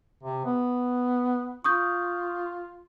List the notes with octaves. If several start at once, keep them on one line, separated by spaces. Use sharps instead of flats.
C3
B3
F4 C#6 D#6 G6